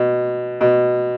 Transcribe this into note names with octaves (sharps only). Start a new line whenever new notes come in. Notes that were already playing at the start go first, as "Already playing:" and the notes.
Already playing: B2
B2